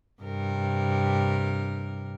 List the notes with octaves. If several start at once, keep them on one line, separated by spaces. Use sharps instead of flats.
G2 C3 A#4